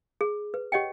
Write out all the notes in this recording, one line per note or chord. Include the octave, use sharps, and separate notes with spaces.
G#4
B4
G4 C#5 D#5 F#5 G5